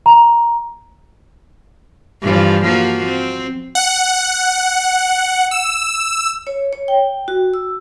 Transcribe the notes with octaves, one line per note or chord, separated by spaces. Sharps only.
A#5
G2 E3 F3
F3 A#3 F#4
C4
F#5
E6
C#5
C#5
G5
F#4
E6